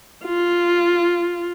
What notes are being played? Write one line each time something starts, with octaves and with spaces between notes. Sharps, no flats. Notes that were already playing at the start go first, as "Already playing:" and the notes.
F4